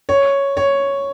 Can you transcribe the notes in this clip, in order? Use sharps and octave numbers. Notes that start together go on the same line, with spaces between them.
C#5
C#5